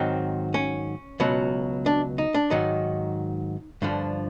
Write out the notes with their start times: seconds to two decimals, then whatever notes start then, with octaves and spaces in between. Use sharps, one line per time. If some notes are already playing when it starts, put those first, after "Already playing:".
Already playing: G#2 D#3 F#3 C4
0.54 C#4
1.20 C#2 B2 F#3
1.86 D4
2.18 D#4
2.34 D4
2.50 G#2 D#3 F#3 D#4
3.82 G2 D3 F3 D4